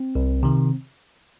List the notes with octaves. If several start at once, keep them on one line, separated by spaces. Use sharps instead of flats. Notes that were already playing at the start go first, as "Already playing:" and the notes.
Already playing: C4
C2
C3 D#3